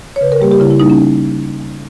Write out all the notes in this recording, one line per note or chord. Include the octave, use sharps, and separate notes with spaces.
C#5
C#3 B4
A#4
G3 A#3 G4
G4
C#3 E4
E4
G3 A#3 D#4
C#4